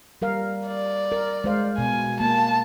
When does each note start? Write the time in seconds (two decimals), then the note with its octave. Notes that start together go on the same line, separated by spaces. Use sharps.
0.22 G3 A#4 F5
0.67 D5
1.12 A#4
1.44 G#3 C5 F5
1.78 B2 G#5
2.20 A#3 A5